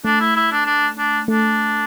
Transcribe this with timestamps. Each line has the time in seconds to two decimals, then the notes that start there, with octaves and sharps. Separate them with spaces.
0.05 A3 D4
0.20 E4
0.36 E4
0.52 D4
0.66 D4
0.98 D4
1.28 A3 D4